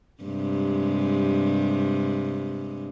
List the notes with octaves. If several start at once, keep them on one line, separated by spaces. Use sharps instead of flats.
G2 C3 G#3